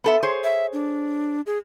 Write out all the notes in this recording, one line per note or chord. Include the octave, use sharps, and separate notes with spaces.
B3 A4 E5
G#4 C5 C#5
E5
D4
G#4